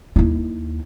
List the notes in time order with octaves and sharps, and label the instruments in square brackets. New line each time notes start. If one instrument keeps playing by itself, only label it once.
[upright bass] D#2 E4